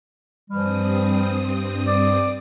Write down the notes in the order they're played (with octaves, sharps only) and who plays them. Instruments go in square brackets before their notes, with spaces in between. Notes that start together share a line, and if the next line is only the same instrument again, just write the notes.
[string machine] G2 C4 D#6 [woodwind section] E3 F3 G3
[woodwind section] D5 D6